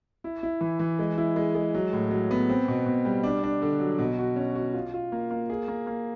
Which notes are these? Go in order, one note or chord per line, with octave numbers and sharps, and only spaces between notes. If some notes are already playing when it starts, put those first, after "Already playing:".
E4
E4
E3
E3
G#3
E4
G#3
G#3
F#3
A2
F#3
B3
C4
B2
B2
G3
D4
D4
D3
F#3
B2
F#4
C#4
F#4
F4
F4
A#3
A#3
G#4
A#3
A#3